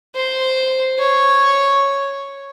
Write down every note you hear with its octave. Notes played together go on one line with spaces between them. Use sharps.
C5
C#5